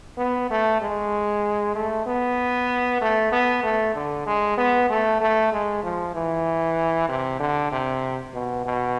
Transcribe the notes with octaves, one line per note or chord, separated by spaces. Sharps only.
B3
A3
G#3
A3
B3
A3
B3
A3
D3
G#3
B3
A3
A3
G#3
F3
E3
C3
D3
C3
B2
B2